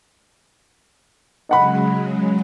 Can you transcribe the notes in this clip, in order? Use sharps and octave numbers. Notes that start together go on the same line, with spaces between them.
C#3 F#3 G#3 D#5 F#5 B5